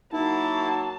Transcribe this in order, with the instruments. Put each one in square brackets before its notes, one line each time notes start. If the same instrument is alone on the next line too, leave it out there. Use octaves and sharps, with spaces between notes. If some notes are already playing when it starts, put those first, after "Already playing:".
[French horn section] F#3 A#3 F#4 [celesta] D#4 [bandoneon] E4 [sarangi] A5